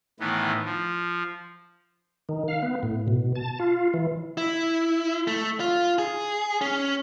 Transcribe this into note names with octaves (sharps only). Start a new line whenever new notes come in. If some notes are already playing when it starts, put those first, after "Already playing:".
A2 D#3 E3 B3
F3
D#3
F5
B3
A2
B2
A5
F4
E3
E4
A3
F4
G#4
C#4